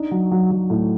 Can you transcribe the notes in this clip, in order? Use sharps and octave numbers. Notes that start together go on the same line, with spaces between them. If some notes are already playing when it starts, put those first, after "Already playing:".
Already playing: D4 D#4
F#3
F#3
F#3
A2